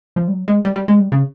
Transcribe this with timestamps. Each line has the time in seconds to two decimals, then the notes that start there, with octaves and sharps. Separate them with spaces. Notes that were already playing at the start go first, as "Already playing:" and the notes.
0.16 F3
0.28 G3
0.33 F#3
0.48 G#3
0.65 G3
0.76 G3
0.88 G#3
0.99 G3
1.12 C#3